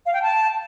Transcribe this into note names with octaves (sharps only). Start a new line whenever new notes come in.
F5
G5
A5